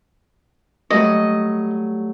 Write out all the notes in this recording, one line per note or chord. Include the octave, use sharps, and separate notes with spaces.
F#3 G3 A3 D#5